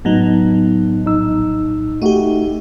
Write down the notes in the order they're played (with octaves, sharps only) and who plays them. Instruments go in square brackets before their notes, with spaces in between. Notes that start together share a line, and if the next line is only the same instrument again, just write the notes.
[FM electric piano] A2 F#3 [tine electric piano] B3 D#4
[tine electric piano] A#1 D#4 E6
[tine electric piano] A3 F#4 [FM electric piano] D#4 G4